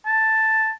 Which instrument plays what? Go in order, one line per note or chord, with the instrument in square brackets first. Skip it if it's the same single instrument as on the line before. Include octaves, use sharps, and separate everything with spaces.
[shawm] A5